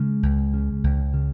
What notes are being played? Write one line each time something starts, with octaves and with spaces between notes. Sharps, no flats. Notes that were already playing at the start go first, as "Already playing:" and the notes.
Already playing: C#3 G#3
C#2
C#3
C#2
C#3